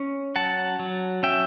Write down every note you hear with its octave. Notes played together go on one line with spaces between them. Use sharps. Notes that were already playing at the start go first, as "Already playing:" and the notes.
Already playing: C#4
F#3 F#5 A5
F#3
C#4 E5 G5